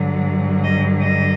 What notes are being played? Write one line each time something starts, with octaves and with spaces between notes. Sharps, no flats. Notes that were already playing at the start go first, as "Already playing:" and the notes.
Already playing: G2 D3 F#3
D#5
D#5